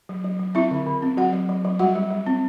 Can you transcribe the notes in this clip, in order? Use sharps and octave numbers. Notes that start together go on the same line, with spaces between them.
F#3
F#3
F#3
C4 E4 E5
D3
D3
C4
F#3 F#4 F#5
F#3
F#3
F#3
G3 F#4 F#5
G3
G3
C4